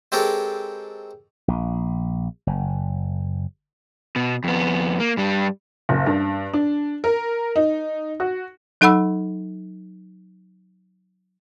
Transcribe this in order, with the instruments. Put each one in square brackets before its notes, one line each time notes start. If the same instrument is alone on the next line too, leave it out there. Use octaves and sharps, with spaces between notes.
[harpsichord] G#3 C4 G4 A4 A#4 C#5
[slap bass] A#1
F#1
[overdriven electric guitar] B2
F2 B3
A#3
G2 G3
[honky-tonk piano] F#1
G2
D4
A#4
D#4
F#4
[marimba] F#3 D#4 A4 F#5 B5 E6